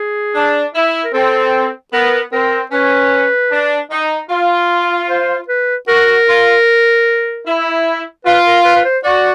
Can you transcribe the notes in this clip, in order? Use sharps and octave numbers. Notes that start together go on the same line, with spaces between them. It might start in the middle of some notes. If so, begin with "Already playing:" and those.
Already playing: G#4
D4
E4
A#4
C4 A4
B3 A#4
C4 A#4
C#4 B4
D4
D#4
F4
C5
B4
F#4 A#4
F4
E4
F4 B4
A#4
B4
B4
C5
F#4 D5